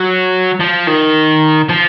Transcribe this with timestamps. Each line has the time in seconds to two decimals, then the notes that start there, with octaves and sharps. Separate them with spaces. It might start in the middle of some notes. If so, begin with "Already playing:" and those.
Already playing: F#3
0.60 F3
0.87 D#3
1.69 F3